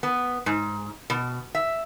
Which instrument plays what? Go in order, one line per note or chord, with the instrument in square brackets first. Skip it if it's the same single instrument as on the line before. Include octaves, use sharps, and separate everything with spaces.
[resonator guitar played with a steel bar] B3
G#2
B2
E5